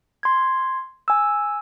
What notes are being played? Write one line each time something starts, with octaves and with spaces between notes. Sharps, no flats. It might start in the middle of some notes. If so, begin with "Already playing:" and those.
C6 G#6
G#5 E6